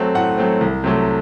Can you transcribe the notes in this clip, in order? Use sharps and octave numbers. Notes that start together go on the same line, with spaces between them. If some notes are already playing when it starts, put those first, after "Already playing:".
Already playing: F#3 A3 C4
A2 F#5
F#3 A3 C4
C2
C3 F#3 A3